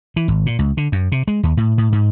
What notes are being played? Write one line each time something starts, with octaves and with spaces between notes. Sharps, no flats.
E3
G#1
A#2
C#2
D3
F#2
C3
G#3
D#2
A2
A2
G#2